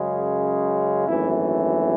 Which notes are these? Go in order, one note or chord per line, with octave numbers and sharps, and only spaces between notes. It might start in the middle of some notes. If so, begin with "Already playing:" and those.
Already playing: F#2 C#3 G#3
G#1 F#2 E3 A3 E4